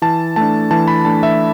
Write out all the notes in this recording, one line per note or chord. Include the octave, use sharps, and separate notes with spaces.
E3 A5
A3 D4 A5
E3 A5
B5
A3 D4 A5
E5